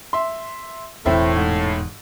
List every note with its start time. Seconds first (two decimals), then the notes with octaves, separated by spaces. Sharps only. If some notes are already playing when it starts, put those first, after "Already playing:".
0.13 E5 C6
1.06 E1 E2 A2 C4 E4 E5
1.36 G#2